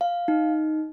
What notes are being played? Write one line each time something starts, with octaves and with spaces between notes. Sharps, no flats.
F5
D#4